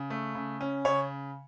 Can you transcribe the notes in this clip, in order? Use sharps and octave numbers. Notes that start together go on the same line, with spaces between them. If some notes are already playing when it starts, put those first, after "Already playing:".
Already playing: C#3
A3
C#3
C#4
C#3 C#5